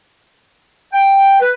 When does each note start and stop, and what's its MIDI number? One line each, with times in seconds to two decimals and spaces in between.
0.93 1.39 79
1.41 1.52 71